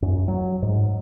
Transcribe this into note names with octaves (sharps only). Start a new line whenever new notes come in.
F#2
F#3
G#2